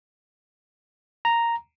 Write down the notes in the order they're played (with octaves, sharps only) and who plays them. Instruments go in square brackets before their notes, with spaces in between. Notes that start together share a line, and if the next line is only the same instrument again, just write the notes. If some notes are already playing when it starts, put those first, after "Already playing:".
[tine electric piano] A#5